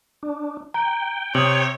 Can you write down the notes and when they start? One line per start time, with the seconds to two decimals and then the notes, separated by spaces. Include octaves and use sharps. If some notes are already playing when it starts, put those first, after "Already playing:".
0.23 D4
0.74 G5 A#5
1.35 C3 C#5 D#6 F#7